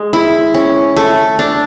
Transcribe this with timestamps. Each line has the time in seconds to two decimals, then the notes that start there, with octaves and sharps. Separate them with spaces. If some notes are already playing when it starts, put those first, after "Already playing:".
Already playing: G#3
0.13 E4
0.54 C#4
0.96 A3
1.39 D4